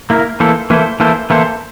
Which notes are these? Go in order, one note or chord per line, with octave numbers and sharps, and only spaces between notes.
A#3 E4 A#4
E3 A#3 E4 A4 C5
E3 A#3 E4 A4 C5
E3 A#3 E4 A4 C5
E3 A#3 E4 A4 C5